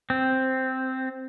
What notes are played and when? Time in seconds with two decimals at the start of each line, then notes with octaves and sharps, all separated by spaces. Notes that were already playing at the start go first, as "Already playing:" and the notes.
0.10 C4